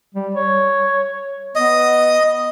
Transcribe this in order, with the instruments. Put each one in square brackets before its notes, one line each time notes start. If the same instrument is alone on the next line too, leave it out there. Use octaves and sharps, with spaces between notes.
[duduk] G3
C#5
[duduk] B3 [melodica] D#5